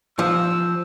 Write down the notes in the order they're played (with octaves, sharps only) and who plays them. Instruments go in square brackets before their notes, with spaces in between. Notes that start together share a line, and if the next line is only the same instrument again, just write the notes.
[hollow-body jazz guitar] F3 [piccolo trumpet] E6